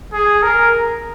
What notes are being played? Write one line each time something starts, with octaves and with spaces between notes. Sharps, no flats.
G#4
A#4